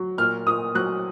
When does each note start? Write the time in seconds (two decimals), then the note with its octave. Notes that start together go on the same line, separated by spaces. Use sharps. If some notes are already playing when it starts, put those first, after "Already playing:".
Already playing: F#3
0.18 A#2 F6
0.46 A#2 D#6
0.75 F#3 F#6